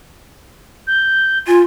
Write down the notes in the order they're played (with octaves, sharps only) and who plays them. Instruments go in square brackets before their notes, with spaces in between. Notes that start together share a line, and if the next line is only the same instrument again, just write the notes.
[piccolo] G6
[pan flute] F4 [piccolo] G#5